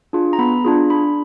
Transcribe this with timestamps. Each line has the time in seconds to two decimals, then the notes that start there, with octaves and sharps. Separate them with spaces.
0.13 D4 F4 G#4
0.33 A#5
0.39 B3 B5
0.65 D4 F4 G#4
0.90 D4 B5